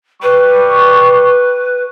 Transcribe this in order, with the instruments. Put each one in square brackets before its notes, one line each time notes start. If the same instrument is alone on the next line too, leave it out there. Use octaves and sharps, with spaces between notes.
[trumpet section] G3 C#6 [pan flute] B4